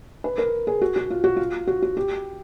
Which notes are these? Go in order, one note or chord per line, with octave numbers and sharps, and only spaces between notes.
B4
A#4
G#4
F#4
F#4
F4
F#4
F4
F#4
F#4
G4